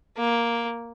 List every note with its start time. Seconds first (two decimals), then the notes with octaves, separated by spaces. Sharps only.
0.17 A#3